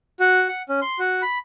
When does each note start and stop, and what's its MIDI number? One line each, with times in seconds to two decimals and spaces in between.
0.20 0.48 66
0.48 0.62 78
0.69 0.80 61
0.82 0.99 84
0.99 1.22 66
1.22 1.38 83